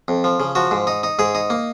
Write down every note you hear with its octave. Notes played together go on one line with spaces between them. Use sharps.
F2
F3
C#3
F3 F#4
G#2
D#4
D#4
G#2 G#4
D#4
A#3